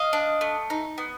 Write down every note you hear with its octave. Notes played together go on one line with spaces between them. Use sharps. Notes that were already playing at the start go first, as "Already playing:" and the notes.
Already playing: D#5 F5
D4
A3
D#4
B3